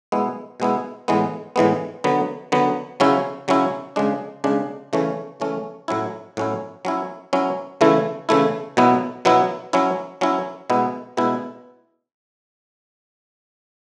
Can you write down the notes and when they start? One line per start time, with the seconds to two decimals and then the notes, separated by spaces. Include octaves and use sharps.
0.12 B2 G#3 B3 E4
0.60 B2 G#3 B3 E4
1.08 A2 E3 G#3 B3
1.56 A2 E3 G#3 B3
2.04 D3 F#3 B3
2.52 D3 F#3 B3
3.00 C#3 F#3 C#4 E4
3.48 C#3 F#3 C#4 E4
3.96 C#3 G#3 D4
4.44 C#3 G#3 D4
4.93 C#3 E3 A3 C#4
5.40 C#3 E3 A3 C#4
5.88 A2 F#3 C#4 E4
6.37 A2 F#3 C#4 E4
6.85 F#3 C#4 E4
7.33 F#3 C#4 E4
7.81 C#3 E3 A3 E4
8.29 C#3 E3 A3 E4
8.77 B2 F#3 B3 E4
9.25 B2 F#3 B3 E4
9.73 F#3 C#4 E4
10.21 F#3 C#4 E4
10.70 B2 G#3 B3 E4
11.17 B2 G#3 B3 E4